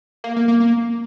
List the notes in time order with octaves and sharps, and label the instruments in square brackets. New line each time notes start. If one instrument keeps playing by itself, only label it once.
[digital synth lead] A#3
A#3
A#3
A#3